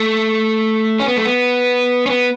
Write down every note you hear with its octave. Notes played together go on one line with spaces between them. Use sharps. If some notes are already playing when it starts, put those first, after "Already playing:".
Already playing: A3
C#4
B3
A3
B3
C#4
B3